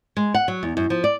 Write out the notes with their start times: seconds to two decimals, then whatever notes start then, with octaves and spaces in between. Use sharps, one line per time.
0.17 G#3
0.34 F#5
0.48 F#3
0.63 E2
0.77 F#2
0.90 F3
1.04 D5